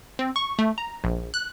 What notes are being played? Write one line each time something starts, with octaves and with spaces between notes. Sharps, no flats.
C4
C#6
A3
A#5
A#1
F#6